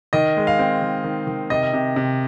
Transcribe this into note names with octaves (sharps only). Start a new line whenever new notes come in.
D#3 D#5
G#3
F5
C4
D#3
D#3
D#3
C3 D#5
C3
C3